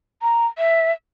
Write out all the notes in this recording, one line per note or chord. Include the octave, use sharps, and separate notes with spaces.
A#5
E5